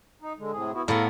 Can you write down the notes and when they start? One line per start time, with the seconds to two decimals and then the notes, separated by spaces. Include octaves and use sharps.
0.22 D#4
0.39 D3 G#3
0.52 A2 C3 G#4
0.73 B3 E4 F#4
0.88 A2 B3 A4 F5 A#5